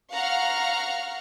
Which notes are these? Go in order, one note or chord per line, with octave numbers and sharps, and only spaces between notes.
F5 F#5 A#5 C#6 F6